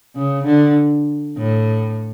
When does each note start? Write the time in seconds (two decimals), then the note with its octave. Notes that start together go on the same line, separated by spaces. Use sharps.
0.15 C#3
0.45 D3
1.37 A2